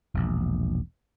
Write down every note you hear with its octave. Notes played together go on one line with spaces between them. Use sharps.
E1 A#1